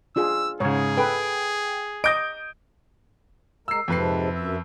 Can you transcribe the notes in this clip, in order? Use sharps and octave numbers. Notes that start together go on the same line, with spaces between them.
D4 F4 G#4 E6
G#2 C#3 G#4 C#5
A4 B4 G5
D#5 D6 D#6 G6 D7
G#3 A#4 E6 C7
F2 G#2 C3 A4 B4 C7
F#2 E5